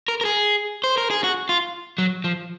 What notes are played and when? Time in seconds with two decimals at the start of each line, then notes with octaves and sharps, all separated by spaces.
0.08 A#4
0.21 A#4
0.25 G#4
0.84 C5
0.97 A#4
1.10 G#4
1.24 F#4
1.49 F4
1.98 F#3
2.24 F3